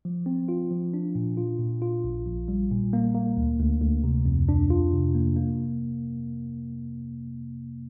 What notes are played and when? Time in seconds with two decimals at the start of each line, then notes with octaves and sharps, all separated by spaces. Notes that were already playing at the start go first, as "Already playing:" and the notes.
0.05 F3
0.26 C4
0.49 F4
0.71 F3
0.94 D4
1.15 A#2
1.37 F4
1.59 A#2
1.82 F4
2.04 A#1
2.26 A#1
2.48 G3
2.71 A#2
2.93 A#3
3.15 A#3
3.37 D2
3.59 D2
3.81 D2
4.04 C3
4.26 F2
4.49 D4
4.70 F4
4.93 C3
5.15 A#3
5.36 A#3